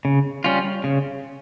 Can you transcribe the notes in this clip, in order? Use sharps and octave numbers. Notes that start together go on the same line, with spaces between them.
C#3
G3 C#4 F4
C#3